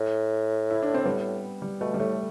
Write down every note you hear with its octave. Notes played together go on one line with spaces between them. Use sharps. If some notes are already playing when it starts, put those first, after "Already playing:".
Already playing: A2
E4
D4
C4
G3 B3
G3
B2 A3
G3
A2 A3